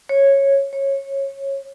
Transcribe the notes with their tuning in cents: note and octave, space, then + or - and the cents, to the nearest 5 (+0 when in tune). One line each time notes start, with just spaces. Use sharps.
C#5 -10
C#5 -20